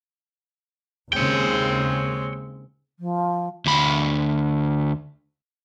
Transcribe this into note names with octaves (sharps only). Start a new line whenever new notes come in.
D#2 C#3 G#3 C4 C#5 G5
F3
D2 B5